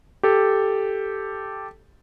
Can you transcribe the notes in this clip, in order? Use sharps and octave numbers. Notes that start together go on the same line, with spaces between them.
G4 A4